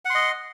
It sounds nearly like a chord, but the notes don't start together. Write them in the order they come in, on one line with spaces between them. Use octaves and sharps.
F#5 C6 D#5